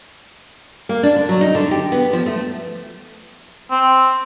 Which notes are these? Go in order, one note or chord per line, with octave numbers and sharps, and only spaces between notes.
A#3
D4
D3
F#3
D#4
D3
G4
B3
F3
A3
C4